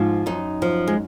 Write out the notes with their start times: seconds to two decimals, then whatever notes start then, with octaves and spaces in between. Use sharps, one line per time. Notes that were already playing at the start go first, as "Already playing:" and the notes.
Already playing: G#2 F3 F4
0.26 F#2 D#4
0.62 F3
0.87 G#3